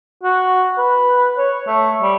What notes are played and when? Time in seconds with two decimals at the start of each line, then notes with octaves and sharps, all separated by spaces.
0.23 F#4
0.78 B4
1.38 C#5
1.67 A3
2.02 G3